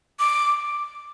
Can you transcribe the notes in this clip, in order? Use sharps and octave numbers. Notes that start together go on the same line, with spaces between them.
D6